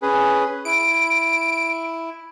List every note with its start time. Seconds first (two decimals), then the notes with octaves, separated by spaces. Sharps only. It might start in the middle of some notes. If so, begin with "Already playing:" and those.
0.02 C#4 G#4 B4
0.65 E4 D7